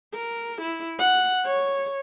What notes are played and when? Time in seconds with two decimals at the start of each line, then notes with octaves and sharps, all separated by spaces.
0.14 A#4
0.62 E4
0.99 F#5
1.46 C#5